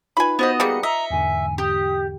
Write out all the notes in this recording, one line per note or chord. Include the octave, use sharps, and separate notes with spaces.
D#4 F4 B4 G#5 B5
B3 F#4 C5 D#5
G3 A#3 D#4 G#4 C#7
D#5 E5 A#5
E2 G#2 D3 G#5
G4 D#6